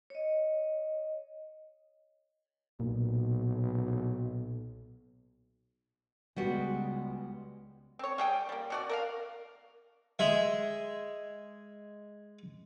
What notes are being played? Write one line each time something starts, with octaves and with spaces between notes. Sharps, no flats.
C#5 D#5
B1 A#2
C#2 G3 G#3 B3 F#4
C4 C#5
G3 G#4 G5
G3 A#3
B2 F#4 D5
A#4 E5 F5
G#3 E5